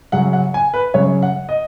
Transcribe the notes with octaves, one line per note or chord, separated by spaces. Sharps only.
F#2 C#3 F#3 F#5
F#5
G#5
B4
F#2 C#3 F#3 C#5
F#5
D#5